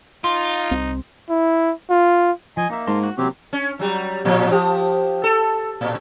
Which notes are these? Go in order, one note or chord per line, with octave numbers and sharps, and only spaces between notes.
D#4 F4 C6
C2 C4
E4
F4
F3 D#5 G#5
A#3 D#4 E5
G#2 A#4 A5 C6
F#4
C3 E3 F#3 A#3 C4 C#4 G4
C#4
F#3 G3
A2 F3
F3 G4
A4
A2